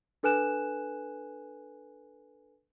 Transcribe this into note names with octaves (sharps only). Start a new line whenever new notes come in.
D4 A4 B4 G#5 F#6 E7